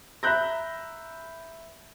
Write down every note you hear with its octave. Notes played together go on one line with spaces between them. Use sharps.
E5 A#5 B5 F#6 G6 A#6